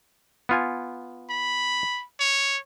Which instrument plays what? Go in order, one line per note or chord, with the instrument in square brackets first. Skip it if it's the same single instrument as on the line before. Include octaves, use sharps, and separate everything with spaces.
[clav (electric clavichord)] B3 F4 G#5
[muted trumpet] B5
C#5